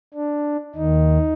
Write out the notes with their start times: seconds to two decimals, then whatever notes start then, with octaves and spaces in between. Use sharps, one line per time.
0.14 D4
0.75 D#2 D#3 D#4